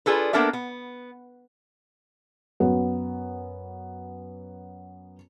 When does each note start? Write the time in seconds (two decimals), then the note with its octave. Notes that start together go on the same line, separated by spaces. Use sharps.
0.06 D4 F4 G#4 A4 B4
0.33 A#3 B3 D4 A4 A#4 E5
0.53 B3
2.60 F#2 B3 F#4